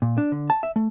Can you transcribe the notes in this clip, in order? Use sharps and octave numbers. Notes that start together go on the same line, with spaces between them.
A#2
D4
D3
A5
E5
A3